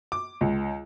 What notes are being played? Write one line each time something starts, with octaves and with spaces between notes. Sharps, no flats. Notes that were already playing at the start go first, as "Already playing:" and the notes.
D6
C#2